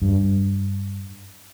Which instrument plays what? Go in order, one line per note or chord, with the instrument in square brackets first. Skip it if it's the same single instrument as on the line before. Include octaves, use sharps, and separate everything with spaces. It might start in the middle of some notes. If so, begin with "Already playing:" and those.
[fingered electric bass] G2